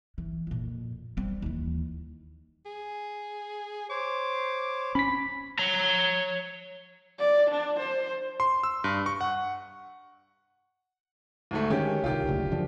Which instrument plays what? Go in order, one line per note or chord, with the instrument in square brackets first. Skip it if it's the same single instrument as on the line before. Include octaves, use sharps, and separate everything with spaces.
[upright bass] E3
F2 A#2
G3 C4
D#2 E3
[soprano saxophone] G#4
[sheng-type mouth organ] C5 C#5 [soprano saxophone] D6
[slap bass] C#4 [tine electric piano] B5 B6
[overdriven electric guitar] C#5 A#5
[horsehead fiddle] D5
D4
C5
[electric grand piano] C6
E6
G2
C#6
F#5
[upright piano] D2 G#2 A3
[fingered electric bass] D#3 G#3 [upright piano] C#4 G4
[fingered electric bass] C2 D#3 [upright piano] F4 G4
[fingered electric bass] F#1 D2
F#2 D3 F3